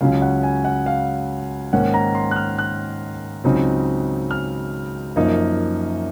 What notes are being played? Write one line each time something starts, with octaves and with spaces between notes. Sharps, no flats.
C#2 C#3 F#3 C#4 F5
F#5
G#5
F#5
F5
G#2 D#3 A#3 C#4 F#5
A#5
C6
F#6
F6
F#6
C#2 C#3 F#3 C4 D#4
F6
F#2 F3 A#3 D#4